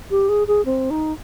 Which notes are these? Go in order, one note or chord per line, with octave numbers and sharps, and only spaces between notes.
G4
G#4
G#4
C4
D#4